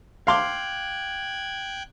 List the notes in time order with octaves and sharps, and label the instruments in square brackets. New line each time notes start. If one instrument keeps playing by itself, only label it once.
[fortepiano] F5 C6 D6 [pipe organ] G5 F#6 G#6